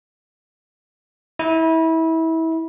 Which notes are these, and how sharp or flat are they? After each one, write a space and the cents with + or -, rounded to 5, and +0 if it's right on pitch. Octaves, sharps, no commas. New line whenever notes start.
E4 -25